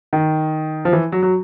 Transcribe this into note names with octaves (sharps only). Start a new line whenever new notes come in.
D#3
F3
E3
F#3
F#3